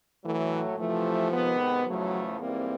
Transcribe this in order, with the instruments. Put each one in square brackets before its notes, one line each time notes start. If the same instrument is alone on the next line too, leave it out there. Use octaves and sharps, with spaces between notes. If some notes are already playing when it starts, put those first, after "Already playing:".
[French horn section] A2 F#3 A3 [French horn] E3
[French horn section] C3 E3 A3 [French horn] F3
[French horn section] C3 D#3 G#3 B3
[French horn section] E2 C#3 F3 A3 [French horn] F#3
[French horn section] G#2 E3 G3 A#3 [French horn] C4